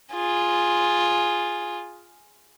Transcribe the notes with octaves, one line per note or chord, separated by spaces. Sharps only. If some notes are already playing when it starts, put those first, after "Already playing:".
F4 G#4